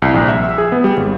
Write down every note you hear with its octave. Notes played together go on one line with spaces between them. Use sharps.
C2
A#1
E5
E6
G#4
B3
G3
G#1